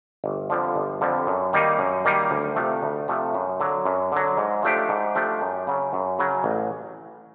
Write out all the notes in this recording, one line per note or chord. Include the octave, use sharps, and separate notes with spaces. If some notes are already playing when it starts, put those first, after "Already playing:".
G1
F2 D3 F3
G1
F2 D3 F3
F#2
D#3 G3 A#3 D#4
F#2
D#3 G3 A#3 D#4
D2
C3 F3 A3
D2
C3 F3 A3
F#2
D3 F#3
F#2
D3 F#3
G#2
F3 A3 D4 G4
G#2
F3 A3 D4 G4
F#2
C#3 F#3
F#2
C#3 F#3
A1